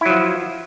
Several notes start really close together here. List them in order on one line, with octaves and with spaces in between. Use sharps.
E4 F#3 F3